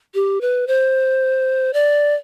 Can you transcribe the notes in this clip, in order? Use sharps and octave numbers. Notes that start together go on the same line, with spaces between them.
G4
B4
C5
D5